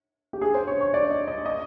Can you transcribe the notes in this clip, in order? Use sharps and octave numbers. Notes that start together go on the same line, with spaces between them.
G4
G#4
C5
C#5
C#5
D5
D#5
D#5
D#5